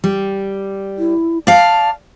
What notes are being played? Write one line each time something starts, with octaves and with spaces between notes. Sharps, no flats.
G3
E4
D5 F5 A5